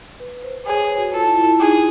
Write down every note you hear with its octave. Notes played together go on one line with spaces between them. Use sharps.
B4
C5
G#4 C#5
B4
F#4
F4 A4
E4
E4
E4
D#4 G#4